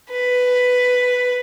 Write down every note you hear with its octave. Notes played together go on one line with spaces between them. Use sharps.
B4